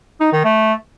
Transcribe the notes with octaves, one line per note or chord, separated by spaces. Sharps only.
D#4
D#3
A3